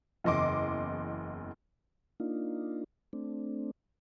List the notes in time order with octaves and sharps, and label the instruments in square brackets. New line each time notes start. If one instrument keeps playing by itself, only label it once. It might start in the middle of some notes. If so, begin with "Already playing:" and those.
[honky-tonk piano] F#1 E2 D#5 C6 D6
[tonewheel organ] A#3 D4 D#4 F4
A3 C4 D4